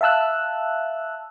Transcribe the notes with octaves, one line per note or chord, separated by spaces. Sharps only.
E5 F5 A5 E6 F#6